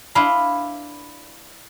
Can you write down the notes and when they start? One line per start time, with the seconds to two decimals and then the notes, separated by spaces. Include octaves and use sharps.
0.15 D4 E4 B4 F5 C6